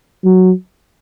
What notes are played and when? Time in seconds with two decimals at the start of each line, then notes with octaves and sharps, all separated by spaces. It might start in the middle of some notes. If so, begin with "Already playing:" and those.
0.24 F#3